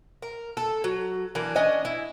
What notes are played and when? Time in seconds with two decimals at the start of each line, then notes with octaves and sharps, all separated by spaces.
0.22 A#4
0.57 A4
0.84 F#3
1.35 E3 A#3 D4
1.55 C#4 D4 D#5 G#5
1.85 E4